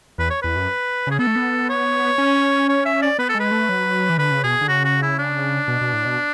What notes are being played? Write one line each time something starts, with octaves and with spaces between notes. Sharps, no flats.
E2 B4
C#5
E2 B4
F#2
C#3 G#4
B3 A4
A3
B3
C#5
C#4
C#5
E5
D5
B3 B4
A4
G#3 B4
A3
F#3
E3
D3 B4
C#3
B2 G#4
D3
C#3 F#4
F#4
E4
D4
B2
B2
A2
B2